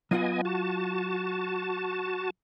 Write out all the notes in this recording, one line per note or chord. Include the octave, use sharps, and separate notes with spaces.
F#3 B3 F4 D#5 F#5 G#5
F#4 A5